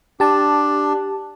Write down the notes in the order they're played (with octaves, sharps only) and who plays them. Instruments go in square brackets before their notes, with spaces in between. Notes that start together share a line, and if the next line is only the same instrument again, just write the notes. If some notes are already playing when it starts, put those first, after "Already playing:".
[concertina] D4 [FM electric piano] G4 A5